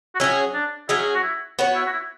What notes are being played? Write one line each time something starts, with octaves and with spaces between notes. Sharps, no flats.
F#4
F#3 C#4 E4 G#4
D4
F#3 C#4 E4 G#4
F#4
E4
B3 F#4 C#5
E4
F#4
E4